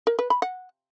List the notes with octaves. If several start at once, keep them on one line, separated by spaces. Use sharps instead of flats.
A#4
B4
B5
F#5